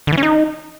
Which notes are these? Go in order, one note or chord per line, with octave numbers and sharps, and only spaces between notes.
D3
E3
C#4
D#4